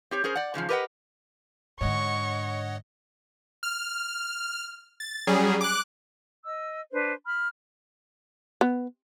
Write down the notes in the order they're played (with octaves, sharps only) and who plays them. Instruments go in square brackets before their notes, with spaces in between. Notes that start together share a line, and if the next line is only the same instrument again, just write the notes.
[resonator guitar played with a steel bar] C4 G4 C#5
C#4 G#4 A#4 C5
D5 F#5
G#2 C#3 E3 F3
G4 A#4 B4 C#5 D#5 F#5
[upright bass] G#2 D3 [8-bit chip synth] C#5 D#5 F#5 [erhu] C#6
[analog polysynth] F6
A6
F#3 G3 C#4 G#4
D6 F#6
[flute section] D#5 E6
D4 B4 C5
B5 F6
[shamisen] B3